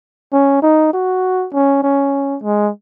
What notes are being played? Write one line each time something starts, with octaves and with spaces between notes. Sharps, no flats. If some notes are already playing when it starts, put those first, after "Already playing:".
C#4
D#4
F#4
C#4
C#4
G#3